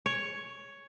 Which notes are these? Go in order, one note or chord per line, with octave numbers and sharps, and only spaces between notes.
C#5